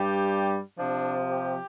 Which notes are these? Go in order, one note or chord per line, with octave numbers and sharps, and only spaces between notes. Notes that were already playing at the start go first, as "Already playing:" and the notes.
Already playing: G2 G3 G4
C3 F3 D4
G4